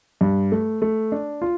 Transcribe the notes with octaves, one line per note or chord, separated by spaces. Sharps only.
G2
A3
A3
D4
F4